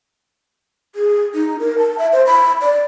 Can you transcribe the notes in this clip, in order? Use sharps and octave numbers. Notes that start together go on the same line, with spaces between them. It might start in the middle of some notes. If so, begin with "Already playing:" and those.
G#4
D#4
A#4
A5
E5
C5
B5
D5